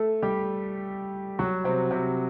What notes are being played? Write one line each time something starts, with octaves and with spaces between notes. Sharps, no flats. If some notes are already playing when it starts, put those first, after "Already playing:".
Already playing: A3 A4
G3 G4
F#3 F#4
C3 C4
C3 C4